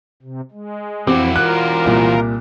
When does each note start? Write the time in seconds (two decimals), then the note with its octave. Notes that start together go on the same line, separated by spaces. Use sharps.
0.22 C3
0.51 G#3
1.07 F2 E3 C4 E4 F#4 D6
1.36 F4 A#4 F#6
1.85 C2 A#2